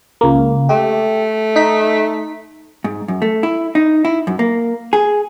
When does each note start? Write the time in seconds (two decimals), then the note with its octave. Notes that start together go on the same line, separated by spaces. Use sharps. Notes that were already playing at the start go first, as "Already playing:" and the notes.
0.21 C#2 A#3
0.69 A3 G4
1.56 D#4 B6
2.84 G#2
3.08 F#2
3.22 A3
3.43 E4
3.75 D#4
4.05 E4
4.27 F#2
4.39 A#3
4.93 G#4